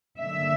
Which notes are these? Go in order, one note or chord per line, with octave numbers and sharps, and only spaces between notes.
G2 D3 F#3 A#3 E5